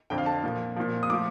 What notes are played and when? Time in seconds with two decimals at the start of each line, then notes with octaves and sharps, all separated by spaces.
0.10 F2 D3 F3 G5
0.18 F5
0.26 A5
0.44 A#2 F3
0.77 A#2 F3
1.03 D#6
1.10 A2 F3 D6